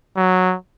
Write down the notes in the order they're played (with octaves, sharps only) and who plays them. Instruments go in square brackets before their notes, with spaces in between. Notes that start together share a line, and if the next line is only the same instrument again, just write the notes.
[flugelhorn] F#3